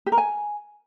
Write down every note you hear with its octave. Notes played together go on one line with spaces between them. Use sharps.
G4
A#4
G#5